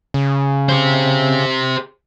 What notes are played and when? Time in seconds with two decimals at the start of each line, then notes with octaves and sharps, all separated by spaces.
0.14 C#3
0.69 G4 C5